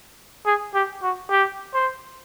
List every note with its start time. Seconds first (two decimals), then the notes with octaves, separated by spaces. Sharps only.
0.46 G#4
0.75 G4
1.02 F#4
1.31 G4
1.74 C5